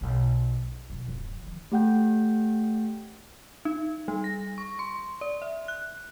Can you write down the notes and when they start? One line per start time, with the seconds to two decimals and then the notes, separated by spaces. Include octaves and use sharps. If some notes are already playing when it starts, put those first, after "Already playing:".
0.01 B1 C#3
0.90 B2 F#3
1.08 D1 F#2
1.43 D#3 F3
1.72 A3 G4 F#5 G5 G6
3.65 D#4
4.08 G3
4.24 A#6
4.58 C#6
4.79 C6
5.21 D5
5.42 E5
5.68 F#6